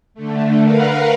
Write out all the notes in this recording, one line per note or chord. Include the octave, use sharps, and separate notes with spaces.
D3 A3
A#4 B4 F5 F#5